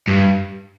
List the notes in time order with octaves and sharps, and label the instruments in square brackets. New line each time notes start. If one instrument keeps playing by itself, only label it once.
[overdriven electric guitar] G2